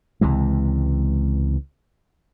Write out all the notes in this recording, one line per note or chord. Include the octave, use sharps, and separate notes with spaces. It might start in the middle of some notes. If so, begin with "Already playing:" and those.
C#2 C3 E3 G#3